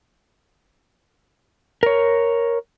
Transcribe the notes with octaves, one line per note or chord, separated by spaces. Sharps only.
A#4 C#5